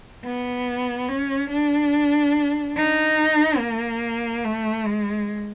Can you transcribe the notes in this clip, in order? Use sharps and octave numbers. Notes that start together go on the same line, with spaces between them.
B3
C#4
D4
D#4
A#3
A3
G#3